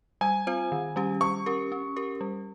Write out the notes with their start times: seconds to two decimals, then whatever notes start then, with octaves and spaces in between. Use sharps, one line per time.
0.21 G3 G#5
0.47 C4 F4 C5
0.72 D#3
0.96 G3 C#4 G4
1.21 G3 C#6
1.46 C#4 G4 A#4
1.72 C#4
1.96 G4 A#4
2.21 G3